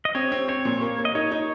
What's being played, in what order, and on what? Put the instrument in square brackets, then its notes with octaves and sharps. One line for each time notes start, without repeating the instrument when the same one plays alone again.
[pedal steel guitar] D#5
[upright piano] C4 [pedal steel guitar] C#5
[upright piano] C4
[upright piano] C4 [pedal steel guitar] C#5
[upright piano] A#2
A#3
A#3
[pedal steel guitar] D#5
[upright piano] D#4 [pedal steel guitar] C#5
[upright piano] D#4